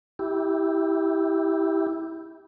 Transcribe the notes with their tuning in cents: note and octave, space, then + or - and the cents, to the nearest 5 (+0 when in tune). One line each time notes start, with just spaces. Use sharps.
E4 -15 G4 +0